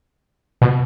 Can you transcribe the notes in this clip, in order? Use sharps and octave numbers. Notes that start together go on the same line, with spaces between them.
B2